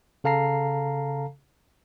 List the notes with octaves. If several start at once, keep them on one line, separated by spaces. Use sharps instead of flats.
C#3 A4 F5 A5 A#5 C7